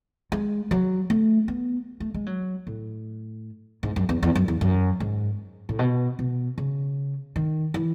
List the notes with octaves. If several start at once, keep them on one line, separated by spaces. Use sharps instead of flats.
G#3
F#3
A3
B3
A3
G#3
F#3
A2
G#2
F#2
E2
E2
F#2
E2
F#2
G#2
A2
B2
B2
C#3
D#3
E3